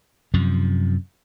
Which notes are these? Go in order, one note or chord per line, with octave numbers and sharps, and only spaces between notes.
F#2 C3 F3